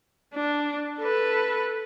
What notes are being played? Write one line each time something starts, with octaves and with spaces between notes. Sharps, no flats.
D4
A4 B4